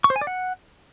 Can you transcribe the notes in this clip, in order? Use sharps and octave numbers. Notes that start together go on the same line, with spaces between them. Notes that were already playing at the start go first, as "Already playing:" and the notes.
C#6
C5
G#5
D5
F#5